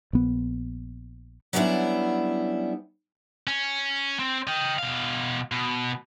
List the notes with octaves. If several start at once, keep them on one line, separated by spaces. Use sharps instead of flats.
A#1 B3
F#3 G3 B3 C#4 D4 E4
C#4
C4
D#5 G5
B2 F5
B2